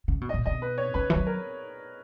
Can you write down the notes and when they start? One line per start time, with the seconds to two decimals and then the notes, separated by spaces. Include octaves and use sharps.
0.08 C#3
0.21 B2
0.29 D#5
0.34 A#2
0.46 B2 D#5
0.62 B4
0.78 C#5
0.94 C#3 B4
1.10 E3
1.16 F#3
1.27 A#4